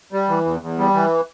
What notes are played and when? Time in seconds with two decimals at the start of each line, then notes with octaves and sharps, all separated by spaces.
0.12 G3
0.29 E3
0.45 E2
0.62 E2
0.79 G3
0.94 E3